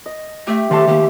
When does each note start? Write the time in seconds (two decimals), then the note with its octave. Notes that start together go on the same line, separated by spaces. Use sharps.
0.06 D#5
0.47 A3 G4 E5
0.71 D#3 A3 G4 C5 A5 C6
0.87 D#3 A#3 G4